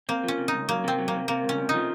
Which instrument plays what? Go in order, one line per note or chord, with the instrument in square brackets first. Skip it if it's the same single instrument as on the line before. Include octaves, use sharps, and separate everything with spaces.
[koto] A#3 [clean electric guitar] C4
[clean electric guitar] F3 [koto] C#4
[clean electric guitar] C3
[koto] D#4
[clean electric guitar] C#2
[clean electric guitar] F#3 [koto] A#3
[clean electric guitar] C3 [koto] C4
[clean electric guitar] F#3
[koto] A#3
[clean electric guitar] C3
[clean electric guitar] C3 [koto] A#3
[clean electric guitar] C#2
[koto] C#4
[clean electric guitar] C3
[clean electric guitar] F3 [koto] D#4